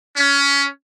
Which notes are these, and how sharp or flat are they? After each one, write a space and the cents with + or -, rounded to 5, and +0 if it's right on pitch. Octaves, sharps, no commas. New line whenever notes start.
C#4 +20